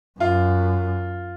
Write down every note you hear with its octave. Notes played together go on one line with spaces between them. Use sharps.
F#2 F4